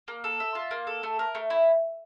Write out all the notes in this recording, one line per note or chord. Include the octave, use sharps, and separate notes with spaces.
A#3
A4
E5
F4
A#3
A4
A3
A#4
A3
E4